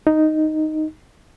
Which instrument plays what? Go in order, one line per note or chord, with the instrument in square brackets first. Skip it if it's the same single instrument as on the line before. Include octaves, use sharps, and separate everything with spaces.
[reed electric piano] D#4